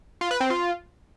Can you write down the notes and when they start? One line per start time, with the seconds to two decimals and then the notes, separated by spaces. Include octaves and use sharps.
0.21 F4
0.31 B4
0.40 C4
0.50 F4